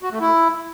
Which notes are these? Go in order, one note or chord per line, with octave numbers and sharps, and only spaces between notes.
F#4
A3
E4